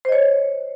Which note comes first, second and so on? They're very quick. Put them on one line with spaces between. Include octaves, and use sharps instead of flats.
C5 D#5 C#5